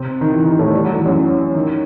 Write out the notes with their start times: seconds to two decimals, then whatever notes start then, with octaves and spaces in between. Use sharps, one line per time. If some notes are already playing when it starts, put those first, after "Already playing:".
Already playing: C3 C4
0.21 D#3
0.31 E3
0.45 D#3
0.59 A2 A3
0.72 G3
0.84 F#3
0.95 E3
1.06 F#2 F#3
1.54 D#3